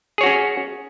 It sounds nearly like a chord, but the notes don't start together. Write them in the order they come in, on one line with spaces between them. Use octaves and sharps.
G#4 C#5 F#4 C#4